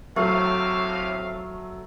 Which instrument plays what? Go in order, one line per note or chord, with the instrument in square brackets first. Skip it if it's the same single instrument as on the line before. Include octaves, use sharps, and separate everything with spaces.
[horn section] A2 C3 F5 [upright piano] F#3 [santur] A3